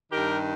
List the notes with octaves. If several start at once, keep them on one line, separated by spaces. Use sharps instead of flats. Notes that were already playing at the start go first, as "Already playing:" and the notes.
G2 D#3 G4 A#4